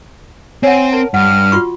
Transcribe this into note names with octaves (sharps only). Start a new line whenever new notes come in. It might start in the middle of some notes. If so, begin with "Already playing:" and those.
C4 C#5 F#5 G#5
A#4 A5
G2 F#5 F6
F4 F#4 C#6